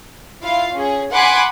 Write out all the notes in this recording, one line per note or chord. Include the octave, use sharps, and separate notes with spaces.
E4 F4 F5
C#4 G#4
F#5 G#5 B5 C6 D6 F#6